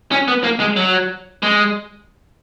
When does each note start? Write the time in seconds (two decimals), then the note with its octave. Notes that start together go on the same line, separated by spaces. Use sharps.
0.11 C#4
0.28 B3
0.44 A#3
0.60 G#3
0.76 F#3
1.43 G#3